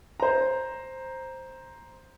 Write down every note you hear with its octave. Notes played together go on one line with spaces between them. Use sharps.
C5 A#5